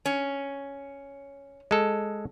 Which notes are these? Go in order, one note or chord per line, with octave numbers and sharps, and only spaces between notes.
C#4
G#3 A4